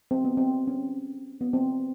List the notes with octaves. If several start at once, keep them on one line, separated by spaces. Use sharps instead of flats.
C4
B3
C4
C#4
B3
C4